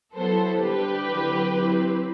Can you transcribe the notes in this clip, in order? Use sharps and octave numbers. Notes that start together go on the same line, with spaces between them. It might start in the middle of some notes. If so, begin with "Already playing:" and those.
F#3 B3 E4 A4 C5
D3 G3 D4 G4 B4
D3 F#3 C4 E4
F#3 C4 E4